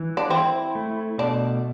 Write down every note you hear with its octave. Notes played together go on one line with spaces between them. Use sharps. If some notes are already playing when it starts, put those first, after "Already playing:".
Already playing: E3
D4
C4 E4
A3
B2 D4